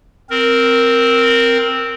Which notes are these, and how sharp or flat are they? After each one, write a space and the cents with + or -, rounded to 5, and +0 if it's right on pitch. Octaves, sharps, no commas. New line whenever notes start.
C4 +0 A#4 +0